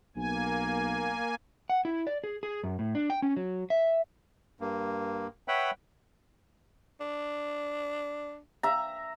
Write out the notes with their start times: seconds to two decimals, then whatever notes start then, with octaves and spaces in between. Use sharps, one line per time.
0.17 B1 A#3 G#5
1.70 F#5
1.85 E4
2.07 D5
2.24 G#4
2.43 G#4
2.64 F#2
2.79 A2
2.95 D4
3.10 G5
3.22 C#4
3.37 F#3
3.70 E5
4.60 G2 A#3
5.48 B4 C#5 E5 F#5 G5 B5
7.01 D4
8.63 E5 A#5